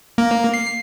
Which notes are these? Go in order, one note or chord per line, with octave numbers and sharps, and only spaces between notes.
A#3
C7